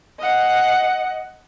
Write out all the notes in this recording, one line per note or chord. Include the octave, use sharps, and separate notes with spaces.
D#5 F#5